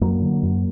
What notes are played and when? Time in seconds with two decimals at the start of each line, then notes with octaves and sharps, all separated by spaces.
0.01 F#2 F#3 A#3
0.22 D3
0.43 F#2